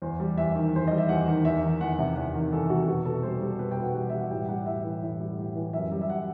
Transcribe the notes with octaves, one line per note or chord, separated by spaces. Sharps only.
E2 C5
G3
E2 E5
D#3
E2 C5
G3 D#5
E5
E2 F#5
D#3
E2 E5
D#3
E2 F#5
C3
E2 F#5
D#3
E2 A4
C3 F#4
B2 F#4
B2 A4
G3 C5
G3
B2 B4
G5
B2
F#5
G3 F#5
G3 E5
F#5
A2 G5
G3 F#5
A2 E5
E3
A2
G3
A2
E3
F#2 E5
G3
E5
F#5